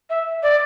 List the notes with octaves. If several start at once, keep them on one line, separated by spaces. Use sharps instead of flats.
E5
D5